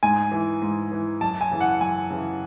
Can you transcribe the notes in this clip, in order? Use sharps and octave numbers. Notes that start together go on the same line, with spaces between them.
G#2 G#5
E3
G#2
E3
F#2 A5
G#5
C#3 E3
F#5
F#2 G#5
C#3 E3